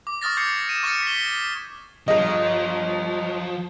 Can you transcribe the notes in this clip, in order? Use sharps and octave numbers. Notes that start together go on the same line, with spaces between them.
D6
C#6 D#6 F6 A6 A#6
C#6 G6 G#6 C7 C#7
D#7 E7
C#6 F6 A6 C#7
B6 G7
G1 F3 D#5